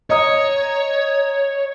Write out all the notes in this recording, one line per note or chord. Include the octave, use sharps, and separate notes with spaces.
C#5 D#5 A#5 D#6